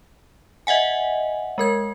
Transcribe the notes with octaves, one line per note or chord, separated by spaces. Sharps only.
D#5 E5 F#5 G#5
G#3 A#4 G#6